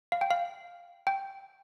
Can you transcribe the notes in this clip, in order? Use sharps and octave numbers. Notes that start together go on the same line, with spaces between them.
F5
G5
F5
G5